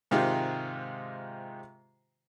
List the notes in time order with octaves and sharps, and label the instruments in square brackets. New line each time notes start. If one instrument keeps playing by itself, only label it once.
[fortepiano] G#2 C3 D#3 G#3 F4 G4